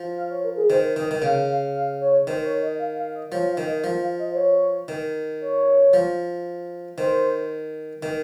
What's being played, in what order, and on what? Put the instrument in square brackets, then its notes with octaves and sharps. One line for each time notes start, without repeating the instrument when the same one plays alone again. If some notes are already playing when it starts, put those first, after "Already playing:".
Already playing: [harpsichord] F3
[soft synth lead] F5
C#5
A#4
G#4
[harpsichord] D#3 [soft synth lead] C5
[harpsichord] D#3 [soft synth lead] D#5
[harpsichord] D#3
[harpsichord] C#3 [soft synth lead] F5
[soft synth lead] F5
F5
C#5
[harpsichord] D#3 [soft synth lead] C5
[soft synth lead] C#5
D#5
F5
F5
D#5
[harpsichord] F3 [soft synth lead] C#5
[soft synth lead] F5
[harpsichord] D#3
[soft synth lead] D#5
[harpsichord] F3 [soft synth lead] F5
[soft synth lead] F5
D#5
C5
C#5
[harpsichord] D#3
[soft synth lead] C#5
[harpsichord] F3
[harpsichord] D#3 [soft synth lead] C5
[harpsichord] D#3